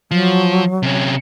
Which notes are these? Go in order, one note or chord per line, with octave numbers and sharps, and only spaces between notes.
F3 F#3
C3 C#4